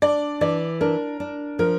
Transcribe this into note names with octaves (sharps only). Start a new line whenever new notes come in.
D4 D5
E3 D5
D4 A#4
D4
F3 A#4